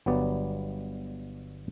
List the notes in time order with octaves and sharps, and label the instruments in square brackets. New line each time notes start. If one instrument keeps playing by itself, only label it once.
[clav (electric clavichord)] G1 F#3 G3 B3 D5